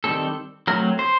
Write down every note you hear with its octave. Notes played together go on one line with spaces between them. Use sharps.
D#3 G3 C4 A4
F#3 A3 C4 A#4
C5